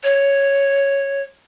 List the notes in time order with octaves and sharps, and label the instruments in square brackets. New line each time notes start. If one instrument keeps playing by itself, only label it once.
[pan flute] C#5